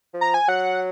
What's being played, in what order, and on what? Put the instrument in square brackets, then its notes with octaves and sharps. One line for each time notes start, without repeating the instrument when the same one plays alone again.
[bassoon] F3
[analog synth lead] A#5
G#5
[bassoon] F#3 [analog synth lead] F#5